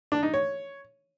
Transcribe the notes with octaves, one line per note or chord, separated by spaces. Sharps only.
D4
D#4
C#5